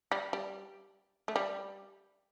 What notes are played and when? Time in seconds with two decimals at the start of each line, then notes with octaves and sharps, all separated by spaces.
0.12 G3
0.33 G3
1.28 A3
1.36 G3